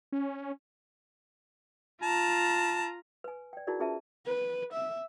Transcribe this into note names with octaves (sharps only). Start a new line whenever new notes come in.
C#4
F4 A5 A#5
B4 G#5
D5 G5
D#4 E4 F#4 G#4 A#4 D5
C#4 F4 G#4 B4 E5 A5
B4
E5